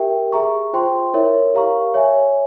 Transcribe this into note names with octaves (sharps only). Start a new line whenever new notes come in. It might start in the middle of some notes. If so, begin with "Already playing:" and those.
Already playing: G4 A#4 E5 G5
G#4 E5 A#5 C#6
F4 C5 G5 C6
E4 A#4 C#5 E5
G4 A#4 F5 A#5 C#6
C#5 E5 G#5